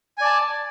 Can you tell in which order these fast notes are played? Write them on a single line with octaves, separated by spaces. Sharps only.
G#5 D5 A5